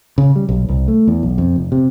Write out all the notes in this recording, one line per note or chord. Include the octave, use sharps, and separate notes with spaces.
C#3
G3
B1
C2
A3
E2
B1
F2
F1
C3